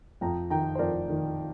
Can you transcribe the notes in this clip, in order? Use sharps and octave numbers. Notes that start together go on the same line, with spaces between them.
F2 G5 A#5
D#3 G5 A#5
C5
F2 A#4 D5
D#3